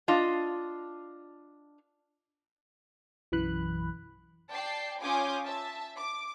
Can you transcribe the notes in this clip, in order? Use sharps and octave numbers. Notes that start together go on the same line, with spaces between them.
D4 F4 D#5
B1 F#2 E3 B5 F#6
D5 G5 A5 C7
C#4 F4 G#5 D6 D#6 G6
E5 A5
D6